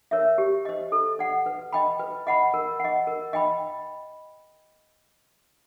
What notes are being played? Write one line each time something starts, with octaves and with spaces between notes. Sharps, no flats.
A#4 C#5 E5
G4
C5 D#5
A4
D5 F#5
B4
D#5 G5 B5
B4
D#5 F#5 B5
A#4
D#5 F#5
A#4
D#5 G5 B5